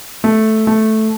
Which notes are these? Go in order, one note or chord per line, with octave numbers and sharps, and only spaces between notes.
A3
A3